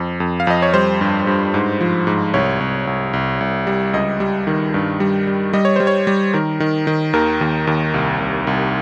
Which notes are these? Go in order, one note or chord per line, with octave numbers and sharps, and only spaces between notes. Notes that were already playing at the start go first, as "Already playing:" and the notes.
Already playing: F2
F2
F5
F2 D#5
C#5
G3 C5
G2
G2
G#2
F3
G#2
C2 C#5
C2
C2
C2
C2
G3
C#2 D#5
G3
D#3
G2
G3
G3
G3 D#5
C#5
G3 C5
C#5
G3
D#3 A#4
D#3
D#3
D#2 A#4
D#2
D#2
C2
C2
C2